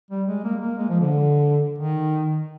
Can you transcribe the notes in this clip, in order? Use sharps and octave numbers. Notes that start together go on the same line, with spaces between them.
G3
G#3
A#3
A#3
G#3
F3
D3
D#3